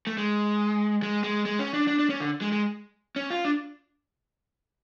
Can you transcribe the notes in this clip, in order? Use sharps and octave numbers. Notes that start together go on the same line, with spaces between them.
A3
G#3
G#3
G#3
G#3
C#4
D4
D4
D4
C#4
D3
G#3
G#3
C#4
F4
D4